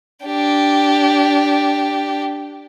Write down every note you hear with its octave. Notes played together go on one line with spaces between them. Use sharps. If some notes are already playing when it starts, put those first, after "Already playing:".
D4 G4